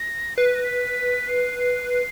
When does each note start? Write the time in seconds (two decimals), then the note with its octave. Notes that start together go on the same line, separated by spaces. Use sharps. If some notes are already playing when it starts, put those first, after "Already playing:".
Already playing: A#6
0.37 B4 C7
0.45 B6
0.55 A#6
0.64 B6
1.28 C7
1.59 C7
1.90 C7